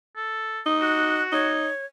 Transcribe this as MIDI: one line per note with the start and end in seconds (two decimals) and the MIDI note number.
0.16 0.61 69
0.66 1.22 63
0.66 0.80 87
0.81 1.53 66
0.81 1.23 90
1.32 1.68 63
1.32 1.86 73